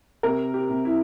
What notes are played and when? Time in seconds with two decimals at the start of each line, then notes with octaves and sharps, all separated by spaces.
0.23 C3 A#4
0.54 G4
0.70 C3
0.85 E4